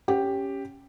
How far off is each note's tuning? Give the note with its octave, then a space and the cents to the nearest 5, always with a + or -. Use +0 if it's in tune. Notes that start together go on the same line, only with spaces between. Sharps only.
C#4 +0 G4 +0